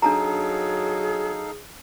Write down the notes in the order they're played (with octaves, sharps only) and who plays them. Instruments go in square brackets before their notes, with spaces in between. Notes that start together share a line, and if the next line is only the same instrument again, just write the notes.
[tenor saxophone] F#3 [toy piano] D4 A5 A#5 [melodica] D#4 A4 F5 [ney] G#4